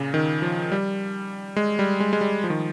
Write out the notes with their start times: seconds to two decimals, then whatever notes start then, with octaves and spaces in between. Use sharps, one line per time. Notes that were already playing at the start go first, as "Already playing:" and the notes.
Already playing: A#2 C#3
0.14 D#3
0.42 F3
0.72 G3
1.56 G#3
1.79 G3
2.00 G#3
2.13 G#3
2.21 G3
2.44 F3
2.50 D#3